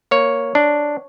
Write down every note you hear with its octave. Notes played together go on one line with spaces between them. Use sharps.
A#3 C#5
D4